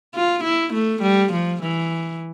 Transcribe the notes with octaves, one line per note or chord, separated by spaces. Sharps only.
F4
E4
A3
G3
F3
E3